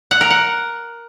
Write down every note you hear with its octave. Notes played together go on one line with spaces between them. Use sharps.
F#5
A#4
F#5